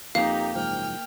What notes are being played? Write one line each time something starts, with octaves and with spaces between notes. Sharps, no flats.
F2 A#3 D#4 G4 F5
F#1 G#2 F3 G5 F6